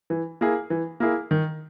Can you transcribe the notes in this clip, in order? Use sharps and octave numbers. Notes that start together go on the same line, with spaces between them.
E3
A#3 E4 G#4
E3
A#3 E4 G#4
D#3